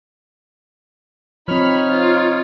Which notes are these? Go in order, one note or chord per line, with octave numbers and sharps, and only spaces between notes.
F3 C4 D#4 C#5 B5 F6
F4